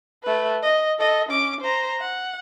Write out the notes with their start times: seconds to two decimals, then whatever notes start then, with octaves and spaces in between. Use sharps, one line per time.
0.23 A3 B4
0.62 D#5
0.99 A4 D#5
1.29 C#4 D6
1.61 C5 A#5
2.00 F#5